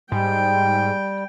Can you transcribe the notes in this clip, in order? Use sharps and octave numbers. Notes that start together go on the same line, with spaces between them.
G#2 G3 G5